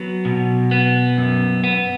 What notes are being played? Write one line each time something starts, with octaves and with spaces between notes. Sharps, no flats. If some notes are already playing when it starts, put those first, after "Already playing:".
Already playing: F#3 B3
B2
B3
F#2
B3